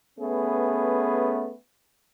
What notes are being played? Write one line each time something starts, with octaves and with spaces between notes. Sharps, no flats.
A3 B3 C#4 G#4 B4